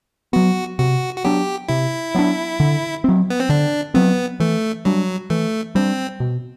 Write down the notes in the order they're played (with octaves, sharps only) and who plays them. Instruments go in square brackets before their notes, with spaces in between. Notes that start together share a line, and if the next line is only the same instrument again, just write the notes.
[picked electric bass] F#3 B3 [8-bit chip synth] F#4
[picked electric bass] C3 [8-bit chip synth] F#4
[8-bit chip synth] F#4
[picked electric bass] F#3 B3 D4 [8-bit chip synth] G4
[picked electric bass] C3 [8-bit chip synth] E4
[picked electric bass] F#3 B3 D4
D3
F#3 C4
[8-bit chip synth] B3
C4
[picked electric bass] D3 [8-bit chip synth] D4
[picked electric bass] F#3 C4 [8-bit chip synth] B3
[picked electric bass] E3 [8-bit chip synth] A3
[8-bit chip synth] F#3 [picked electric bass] G3 D4
[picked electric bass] E3 [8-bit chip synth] A3
[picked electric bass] G3 D4 [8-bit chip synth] C4
[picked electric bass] B2